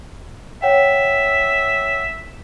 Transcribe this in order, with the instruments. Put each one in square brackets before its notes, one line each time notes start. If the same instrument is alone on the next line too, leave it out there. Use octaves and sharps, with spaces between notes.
[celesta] C#5 F#5 G5 [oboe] E5